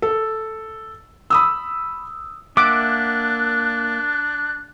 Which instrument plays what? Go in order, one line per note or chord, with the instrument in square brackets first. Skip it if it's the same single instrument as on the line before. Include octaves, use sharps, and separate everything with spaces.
[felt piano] A4
B5 D#6 E6
[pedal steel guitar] A#3 E5 F#5 [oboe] D4 [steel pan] D6 [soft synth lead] F#6